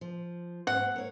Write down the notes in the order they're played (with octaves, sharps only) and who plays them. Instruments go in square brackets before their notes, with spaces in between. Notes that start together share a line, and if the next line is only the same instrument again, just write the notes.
[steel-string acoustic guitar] F3
[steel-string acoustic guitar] G#2 A3 C4 [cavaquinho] F#5
[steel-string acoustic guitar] A#3 C#5